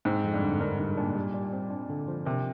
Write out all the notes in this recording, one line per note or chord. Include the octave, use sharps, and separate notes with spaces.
G#2 C4
F2
G2
D3
G2 A#4
G#2 G3
A#2 D4
G3
G3
C4
D4
D3
F3
C3 A#4